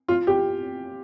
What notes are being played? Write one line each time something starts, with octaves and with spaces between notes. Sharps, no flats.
F4
G4